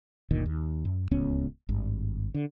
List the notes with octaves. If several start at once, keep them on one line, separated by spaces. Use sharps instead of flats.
F#1 D2 A#2 D#3
D#2
F#2
D1 C#2 B3 C#4
G#1 G2
D3